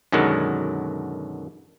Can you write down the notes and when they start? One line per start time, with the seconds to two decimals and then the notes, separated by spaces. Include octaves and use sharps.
0.12 F#2 B2 D3 D#3 F#3 G#3